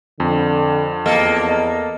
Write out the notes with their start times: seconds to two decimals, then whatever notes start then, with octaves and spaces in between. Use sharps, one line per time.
0.20 F2 D3
1.06 E2 A#3 A4 D#5
1.49 D#5